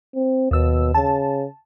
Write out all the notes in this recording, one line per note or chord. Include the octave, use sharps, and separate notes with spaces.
C4
D#2 B2 E6
C#3 A5